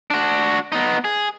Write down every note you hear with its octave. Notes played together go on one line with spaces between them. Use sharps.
D4 F#4
B3 D#4
G#4